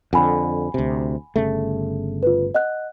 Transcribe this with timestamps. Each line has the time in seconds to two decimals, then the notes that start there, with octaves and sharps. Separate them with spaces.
0.13 F2 D3 F#5 G#5 B5
0.74 D2 C3
1.36 G1 C#3 A3
2.23 F4 B4
2.55 D#5 F#5 F#6